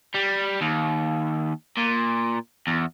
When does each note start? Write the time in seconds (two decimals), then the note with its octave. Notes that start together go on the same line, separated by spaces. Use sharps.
0.14 G3
0.61 D#2
1.77 A#2
2.67 E2